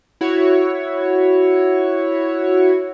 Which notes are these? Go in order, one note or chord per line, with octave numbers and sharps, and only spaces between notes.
E4 F#4 C#5